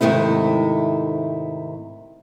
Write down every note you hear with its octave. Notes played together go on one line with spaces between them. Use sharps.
G#2 C3 D#3 A3 E4